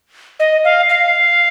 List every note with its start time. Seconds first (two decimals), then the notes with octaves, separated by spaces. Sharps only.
0.40 D#5
0.64 F5
0.89 F5